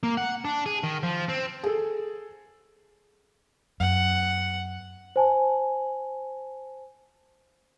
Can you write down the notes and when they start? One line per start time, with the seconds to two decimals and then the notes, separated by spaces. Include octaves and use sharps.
0.03 A#3
0.17 F#5
0.45 D4
0.66 G#4
0.84 D#3
1.03 F3
1.29 C4
1.64 G#4 A4
3.80 F#2 F#5
5.16 C5 G#5 A5